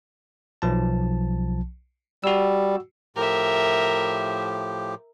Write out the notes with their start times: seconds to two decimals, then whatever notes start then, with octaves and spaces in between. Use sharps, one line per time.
0.62 B1 F3 A5
2.24 G3 F#4 E6
3.16 A2 F3 G4 A#4 E5